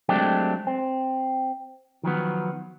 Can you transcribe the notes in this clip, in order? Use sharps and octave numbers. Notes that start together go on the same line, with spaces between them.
F#3 G#3 A3 C4 D4 G4
C4
D#3 F3 F#3 B3